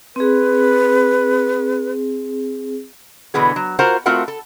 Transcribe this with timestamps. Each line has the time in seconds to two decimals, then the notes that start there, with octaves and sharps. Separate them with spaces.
0.16 C4 G#4 B4
3.34 B2 D3 E3 B3 G#4
3.56 F#3
3.79 F4 F#4 A#4 C5 F#5
4.06 A3 C4 F4 F#4 A#4 F#5
4.28 A4